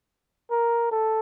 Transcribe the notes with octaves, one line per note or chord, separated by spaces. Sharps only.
A#4
A4